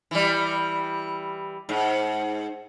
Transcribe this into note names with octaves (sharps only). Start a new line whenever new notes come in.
E3 G3
G#2